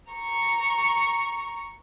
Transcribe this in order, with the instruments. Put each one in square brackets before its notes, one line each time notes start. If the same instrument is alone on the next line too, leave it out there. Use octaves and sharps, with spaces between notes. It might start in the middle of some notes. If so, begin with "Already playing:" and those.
[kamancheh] A#5 C#6